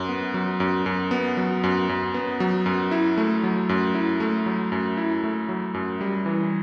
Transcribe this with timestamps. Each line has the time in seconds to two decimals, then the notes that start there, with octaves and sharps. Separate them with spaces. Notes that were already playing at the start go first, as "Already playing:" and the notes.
Already playing: F#2
0.09 B3
0.34 F#3
0.60 F#2
0.86 F#2
1.11 B3
1.37 F#3
1.64 F#2
1.89 F#2
2.14 B3
2.40 F#3
2.66 F#2
2.91 E4
3.17 A3
3.43 F#3
3.69 F#2
3.95 E4
4.20 A3
4.46 F#3
4.72 F#2
4.97 E4
5.24 A3
5.49 F#3
5.74 F#2
6.01 G3
6.26 E3